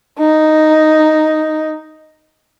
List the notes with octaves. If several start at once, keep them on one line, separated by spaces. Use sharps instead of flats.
D#4